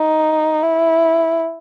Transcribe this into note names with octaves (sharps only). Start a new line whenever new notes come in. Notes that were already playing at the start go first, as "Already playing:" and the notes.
Already playing: D#4
E4